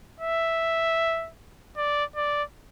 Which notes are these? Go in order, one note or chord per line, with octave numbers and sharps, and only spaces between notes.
E5
D5
D5